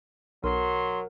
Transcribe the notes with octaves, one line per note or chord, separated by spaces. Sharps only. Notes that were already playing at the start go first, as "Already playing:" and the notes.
B1 F#3 A#4 C6